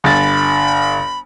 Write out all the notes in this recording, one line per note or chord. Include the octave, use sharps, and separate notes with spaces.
G1 B5 A6